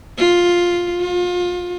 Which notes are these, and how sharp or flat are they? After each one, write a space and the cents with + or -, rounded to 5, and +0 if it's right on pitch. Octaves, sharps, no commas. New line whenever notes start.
F4 +5
F4 +30